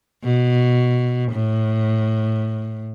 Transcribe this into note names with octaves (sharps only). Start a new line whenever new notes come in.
B2
A2